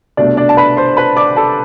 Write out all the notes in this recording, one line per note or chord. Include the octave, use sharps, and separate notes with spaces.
C2 B2 A3 D4 D5
D4 D5
A5
B4 B5
C5 C6
B4 B5
D5 D6
A4 A5